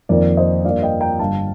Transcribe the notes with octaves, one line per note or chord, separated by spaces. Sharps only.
F2 D#3 A#3 A#4 D5
C5 D#5
G2 F3 A#3 D5 F5
D#5 G5
G5 A#5
G1 G2 D3 F5 A5